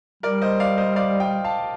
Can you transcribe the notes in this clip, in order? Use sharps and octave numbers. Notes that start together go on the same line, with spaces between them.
G3 A#4 D5
C5 D#5
D5 F5
C5 D#5
D5 F5
D#5 G5
F5 A5